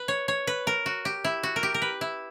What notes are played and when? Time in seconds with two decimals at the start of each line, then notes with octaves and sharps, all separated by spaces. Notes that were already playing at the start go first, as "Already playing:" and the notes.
Already playing: B4
0.08 C#5
0.28 C#5
0.47 B4
0.67 A#4
0.86 F#4
1.05 G4
1.24 E4
1.43 F#4
1.56 A#4
1.63 G4
1.74 A#4
1.82 B4
2.01 E4